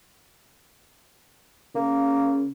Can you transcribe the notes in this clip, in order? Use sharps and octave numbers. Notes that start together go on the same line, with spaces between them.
C#3 A#3